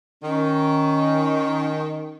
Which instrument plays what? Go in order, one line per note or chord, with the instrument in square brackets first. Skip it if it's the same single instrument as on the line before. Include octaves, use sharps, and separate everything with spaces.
[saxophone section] D#3 [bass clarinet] C#4